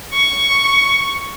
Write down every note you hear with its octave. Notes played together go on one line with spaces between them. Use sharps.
C#6